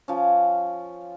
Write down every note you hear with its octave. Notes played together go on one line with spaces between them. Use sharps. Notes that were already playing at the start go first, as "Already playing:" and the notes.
F3 C#4